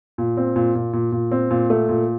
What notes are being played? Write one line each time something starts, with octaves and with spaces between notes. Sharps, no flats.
A#2
C4
A#2
A#2
A#2
A#2
C4
A#2
A3
A#2